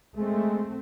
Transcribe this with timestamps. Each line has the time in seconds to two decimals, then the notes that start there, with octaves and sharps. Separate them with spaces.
0.16 G#3 A3 C4